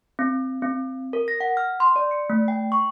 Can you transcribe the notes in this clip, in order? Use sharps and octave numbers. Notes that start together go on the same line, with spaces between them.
C4
C4
A#4
A#6
F#5
F6
C6
D5
C#7
A3
G5
C#6